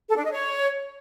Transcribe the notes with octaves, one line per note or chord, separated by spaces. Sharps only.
A4
D4
D#5
C#5